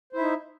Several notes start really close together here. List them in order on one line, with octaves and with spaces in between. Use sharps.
C5 E4 E5 D#4